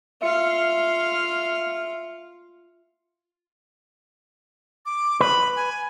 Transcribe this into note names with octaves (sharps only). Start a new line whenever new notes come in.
F4 E5 F5 C#7
D6
B4 B5
G#5